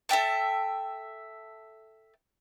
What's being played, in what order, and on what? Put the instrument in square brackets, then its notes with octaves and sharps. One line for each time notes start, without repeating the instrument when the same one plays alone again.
[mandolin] A4 E5 G5 A5